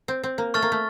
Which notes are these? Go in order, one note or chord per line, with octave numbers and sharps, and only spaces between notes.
C4
C4
A#3
A3 C#6 F6 A6
A#3
A3